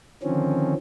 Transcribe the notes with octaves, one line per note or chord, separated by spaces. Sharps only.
D3 D#3 F3 C4 C#4